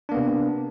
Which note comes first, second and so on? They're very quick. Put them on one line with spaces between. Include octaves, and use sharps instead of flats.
D4 A#3 B3 C3